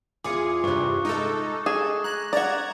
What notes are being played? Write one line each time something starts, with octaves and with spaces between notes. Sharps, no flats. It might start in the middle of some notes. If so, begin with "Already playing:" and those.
E2 F4 G#4 D6 C#7
G2 C3 C#6 F#6
G#3 D#4 A4
G#4 E7
A#5 F#6 G#6 A#6
D5 F#5 A#5 G#6 A6 E7